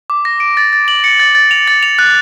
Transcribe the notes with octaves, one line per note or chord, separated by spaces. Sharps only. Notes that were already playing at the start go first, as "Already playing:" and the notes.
D6
A#6
D7
A6
A6
F#7
C#7
A6
A6
F7
A6
F7
F#6